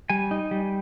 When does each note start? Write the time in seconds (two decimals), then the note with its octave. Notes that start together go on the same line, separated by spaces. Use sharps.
0.10 G3 G#5
0.31 D#4
0.51 G3